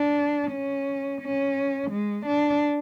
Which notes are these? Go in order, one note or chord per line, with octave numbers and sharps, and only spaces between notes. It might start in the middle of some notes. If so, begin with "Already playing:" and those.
Already playing: D4
C#4
C#4
G#3
D4